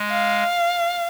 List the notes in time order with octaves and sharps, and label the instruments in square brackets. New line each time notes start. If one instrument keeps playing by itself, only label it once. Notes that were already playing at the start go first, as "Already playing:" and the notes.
Already playing: [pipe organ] G#3
[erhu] F5